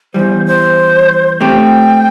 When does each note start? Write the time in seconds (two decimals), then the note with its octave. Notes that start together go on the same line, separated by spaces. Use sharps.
0.14 E2 E3 G3 C5
0.46 C5
1.40 A3 C4 G4 G5